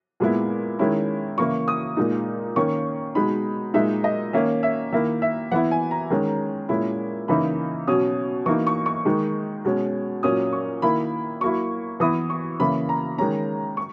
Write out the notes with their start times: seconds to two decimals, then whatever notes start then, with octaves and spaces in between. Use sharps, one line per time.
0.20 A#2 G#3 B3 E4
0.79 D#3 G#3 C#4 E4
1.38 C#3 E3 A#3 E4 C#6
1.68 D#6
1.97 A#2 G#3 D#4
2.56 D#3 A#3 C#4 C#6
3.15 B2 G#3 D#4 B5
3.74 A#2 G#3 D#4 E5
4.04 D#5
4.33 D#3 A#3 C#4 E5
4.63 E5
4.92 D#3 A#3 E4 E5
5.22 E5
5.51 E3 B3 E4 F#5
5.71 G#5
5.91 A#5
6.10 D#3 G#3 C#4
6.69 A#2 G#3 C#4 E4
7.28 C#3 E3 A#3 D#4 B5
7.87 B2 F#3 C#4 D#6
8.46 E3 A#3 D#4 C#6
8.67 C#6
8.86 C#6
9.05 D#3 G#3 D#4
9.65 B2 G#3 C#4
10.23 A#2 F#3 C#4 D#6
10.52 C#6
10.82 D#3 A#3 E4 B5
11.41 F#3 A#3 E4 C#6
12.00 E3 B3 E4 D#6
12.30 C#6
12.60 C#3 E3 A#3 B5
12.89 A#5
13.18 D#3 G#3 C#4 A#5
13.77 C#6